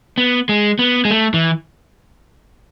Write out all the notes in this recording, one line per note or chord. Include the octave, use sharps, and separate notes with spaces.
B3
G#3
B3
G#3
A3
E3